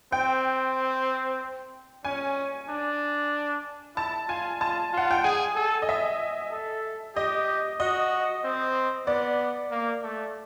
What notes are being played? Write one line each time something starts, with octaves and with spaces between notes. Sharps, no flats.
C4 G5
C#4 G#5
D4
E4 A5
F4 G#5
F4 A5
F4 F#5
G5
G#4 G#5
A4
D#5
E5
A4
G4 D#5
F#4 D#5
C4
B3 D5
A#3
A3